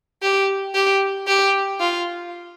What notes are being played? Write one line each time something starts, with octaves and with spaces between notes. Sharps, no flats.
G4
G4
G4
F4